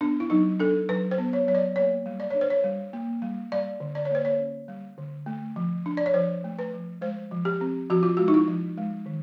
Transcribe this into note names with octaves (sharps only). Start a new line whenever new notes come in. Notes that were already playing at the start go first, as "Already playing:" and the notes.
B3 D4
E4
F#3 D#4
D4 A4
F#3 B4
C5
B3
C#5
F#3 C#5
D5
A#3 C#5
G3
D5
D4 C#5
C5
C#5
G3
A#3
G3
G3 D5
D3
D5
C#5
A#3 C5
C#5
C#4
G3
D3
A3
F3
D4
D5
C#5
F3 C5
A3
B4
F3
G#3 C5
F3
G4
C4
F3 F#4
F4
G#3 F#4
D#4
E4
F3
G#3
D#3